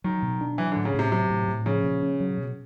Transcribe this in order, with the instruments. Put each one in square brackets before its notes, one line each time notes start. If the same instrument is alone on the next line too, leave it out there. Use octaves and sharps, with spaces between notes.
[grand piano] D#3 [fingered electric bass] F#3
[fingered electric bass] B2
D4
[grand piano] E3 [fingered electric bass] F#3
[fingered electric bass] A2 [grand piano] D3
[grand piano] C#3
[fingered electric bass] A2 [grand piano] C3
[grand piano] C3 [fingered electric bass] F#3
[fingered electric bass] A2
A2
[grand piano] C#3 [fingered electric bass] F3
[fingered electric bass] A#2
C#4
F#3
B2